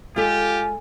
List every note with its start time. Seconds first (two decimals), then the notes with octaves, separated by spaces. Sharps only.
0.16 G#3 F4 G4 A4 G#5